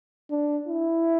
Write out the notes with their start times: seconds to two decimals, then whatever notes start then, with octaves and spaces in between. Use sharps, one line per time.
0.31 D4
0.68 E4